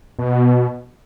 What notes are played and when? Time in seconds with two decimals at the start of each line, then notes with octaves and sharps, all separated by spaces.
0.19 B2